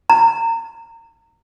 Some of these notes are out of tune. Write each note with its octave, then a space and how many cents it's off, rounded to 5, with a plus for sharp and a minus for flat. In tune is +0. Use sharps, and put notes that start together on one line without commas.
A#5 -30